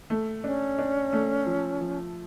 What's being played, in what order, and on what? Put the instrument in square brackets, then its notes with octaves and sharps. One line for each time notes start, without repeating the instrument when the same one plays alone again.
[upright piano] A3
[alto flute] C#4 [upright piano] D4
[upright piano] D4
A3
F3
F3